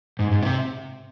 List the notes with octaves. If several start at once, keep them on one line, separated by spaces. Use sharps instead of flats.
G#2
G#2
C3